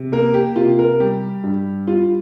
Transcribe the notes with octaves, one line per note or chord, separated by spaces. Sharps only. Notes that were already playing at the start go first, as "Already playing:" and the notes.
Already playing: C3
A#3 A#4
G4
C3 F4
A#4
G3 G4
G2
G3 F4